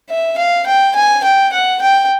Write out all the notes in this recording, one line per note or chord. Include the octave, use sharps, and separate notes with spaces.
E5
F5
G5
G#5
G5
F#5
G5